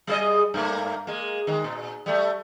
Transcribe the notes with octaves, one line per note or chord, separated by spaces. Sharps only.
G3 G#4 D#5
G2 A3 A#3
G#3 A#3
D#3 G#3
A#2
G3 A3